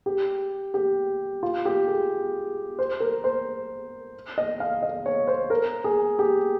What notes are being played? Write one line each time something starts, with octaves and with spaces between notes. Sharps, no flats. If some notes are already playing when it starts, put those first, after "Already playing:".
G4
G4
F4
G4
G#4
C5
A#4
C5
D#5
F5
D#5
C#5
C5
A#4
G#4
G4